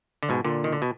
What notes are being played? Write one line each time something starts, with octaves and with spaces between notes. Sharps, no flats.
D3
G#2 B2
A#2 D3
D#3
D3
B2